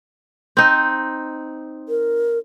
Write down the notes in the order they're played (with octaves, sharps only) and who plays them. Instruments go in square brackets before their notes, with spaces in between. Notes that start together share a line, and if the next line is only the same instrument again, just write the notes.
[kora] C4 D#4
[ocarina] A#4